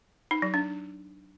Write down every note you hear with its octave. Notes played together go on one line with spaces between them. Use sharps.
D#4
F#3
D4